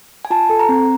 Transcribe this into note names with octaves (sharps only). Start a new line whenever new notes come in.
G#5
F4 A5
A4
A#5
C4